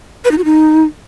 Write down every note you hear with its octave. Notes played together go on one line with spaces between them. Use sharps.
B4
D#4
F#4
D#4